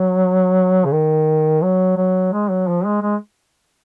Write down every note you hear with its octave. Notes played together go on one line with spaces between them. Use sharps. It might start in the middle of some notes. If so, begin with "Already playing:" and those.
Already playing: F#3
C#3
D#3
F#3
F#3
G#3
F#3
F3
G#3
G#3